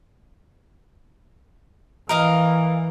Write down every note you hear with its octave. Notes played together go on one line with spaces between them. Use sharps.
E3 A#4 D#5 F5